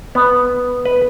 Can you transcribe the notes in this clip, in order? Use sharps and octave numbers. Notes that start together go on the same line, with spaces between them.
B3
B4